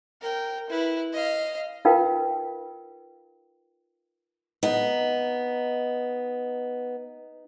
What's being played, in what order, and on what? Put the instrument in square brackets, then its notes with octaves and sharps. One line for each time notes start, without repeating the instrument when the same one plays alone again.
[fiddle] A#4 G5
E4 B4
D#5 F5
[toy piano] D#4 F4 A#4 B4 F5 G5
[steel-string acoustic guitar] B3 [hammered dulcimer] D#4 A#5 C6